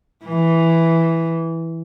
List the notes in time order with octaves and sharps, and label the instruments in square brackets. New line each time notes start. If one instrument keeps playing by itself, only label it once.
[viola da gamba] E3